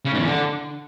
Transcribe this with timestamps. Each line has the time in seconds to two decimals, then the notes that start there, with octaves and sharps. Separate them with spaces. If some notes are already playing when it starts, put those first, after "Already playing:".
0.05 C#3
0.12 G#2
0.19 E2
0.26 D3